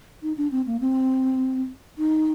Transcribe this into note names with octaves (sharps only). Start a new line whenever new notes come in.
D#4
D4
C4
A#3
C4
D#4